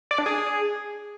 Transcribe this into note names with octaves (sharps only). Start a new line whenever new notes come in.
D5
D4
G#4